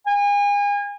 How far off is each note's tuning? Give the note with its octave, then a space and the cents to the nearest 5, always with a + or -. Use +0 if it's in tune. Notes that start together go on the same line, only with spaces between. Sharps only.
G#5 -35